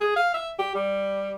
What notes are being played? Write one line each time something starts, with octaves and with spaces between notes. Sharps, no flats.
G#4
F5
E5
G4
G3